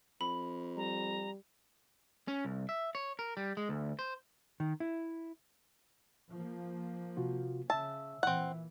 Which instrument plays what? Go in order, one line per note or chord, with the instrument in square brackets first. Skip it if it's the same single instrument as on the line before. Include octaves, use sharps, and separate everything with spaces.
[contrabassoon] F2 [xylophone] B5
[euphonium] G3 [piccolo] A#5
[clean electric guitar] C#4
C2
E5
C#5
A#4
G3
G#3
D2
C5
[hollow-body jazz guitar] D#3
E4
[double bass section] F3 A#3
[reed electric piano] C3 F4 F#4
[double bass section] C#3 [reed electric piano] E5 E6 [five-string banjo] A5
[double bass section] A#2 E3 [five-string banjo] C4 F#5